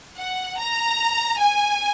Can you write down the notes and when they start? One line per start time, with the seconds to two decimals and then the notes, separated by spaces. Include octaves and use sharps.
0.17 F#5
0.57 A#5
1.37 G#5